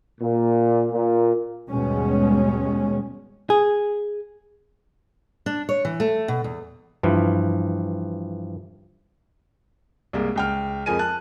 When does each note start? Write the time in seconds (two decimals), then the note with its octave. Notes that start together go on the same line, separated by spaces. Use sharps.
0.21 A#2
0.92 A#2
1.70 D#2 G#2 B2 G3 G#3 C#4
3.50 G#4
5.46 D4
5.69 C#5
5.85 E3
6.00 A3
6.28 B2
6.44 E2
7.03 G2 E3 F3
10.13 C2 G#3 A#3
10.36 C#2 G5 F6
10.86 F2 F3 G#3 A#4 G#5 D#7
10.99 A5 F#6